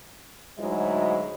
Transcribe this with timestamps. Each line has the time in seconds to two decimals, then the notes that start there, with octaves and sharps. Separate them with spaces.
0.58 D2 G#2 F#3 G#3 E4 D#5